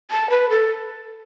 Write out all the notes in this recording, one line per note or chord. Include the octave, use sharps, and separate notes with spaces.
A5
B4
A4